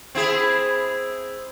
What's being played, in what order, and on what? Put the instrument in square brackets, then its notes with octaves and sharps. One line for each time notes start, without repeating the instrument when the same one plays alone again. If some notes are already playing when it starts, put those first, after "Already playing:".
[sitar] C4 E4 G#4